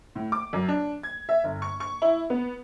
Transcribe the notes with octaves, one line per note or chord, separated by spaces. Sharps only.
A2
D6
F#2
D4
G#6
E5
G1
C#6
C#6
E4
B3